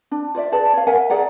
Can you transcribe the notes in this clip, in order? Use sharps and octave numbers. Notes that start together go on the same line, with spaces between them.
D4
F4 C#5 D5 E5
G#4 B4 D5 A5
C#5 F5
A#4 E5 F#5 G#5
G#4 D5 F#5 A#5